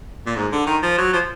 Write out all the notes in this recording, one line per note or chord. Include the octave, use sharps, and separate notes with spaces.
A#2
G#2
D3
D#3
F3
F#3
F3